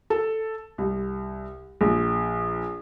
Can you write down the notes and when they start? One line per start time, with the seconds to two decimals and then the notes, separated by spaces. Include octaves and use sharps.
0.10 A4
0.78 C2
1.81 A#1